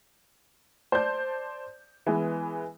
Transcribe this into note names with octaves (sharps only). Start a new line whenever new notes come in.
C5 D5 A5 G6
E3 G#3 B3 G#5